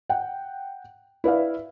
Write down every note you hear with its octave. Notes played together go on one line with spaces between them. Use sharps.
F#5 G5
E4 B4 D5 F5